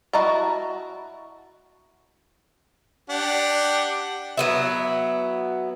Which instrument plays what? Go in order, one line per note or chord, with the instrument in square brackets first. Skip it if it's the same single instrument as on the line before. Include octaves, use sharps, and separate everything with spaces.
[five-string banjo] E4 F#4 D#5 A5 A#5
[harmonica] D4 G4 F#5
[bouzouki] F#3 B3 E4